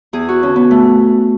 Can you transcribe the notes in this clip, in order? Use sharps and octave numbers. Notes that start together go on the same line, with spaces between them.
E2 G#4
F#4
D3 C#4
B3
A3